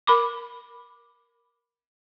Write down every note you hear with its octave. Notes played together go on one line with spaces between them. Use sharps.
A#4 B5 D6